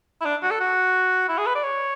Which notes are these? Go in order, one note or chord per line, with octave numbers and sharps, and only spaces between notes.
E4
D4
F#4
A4
F#4
E4
G#4
B4
D5
C#5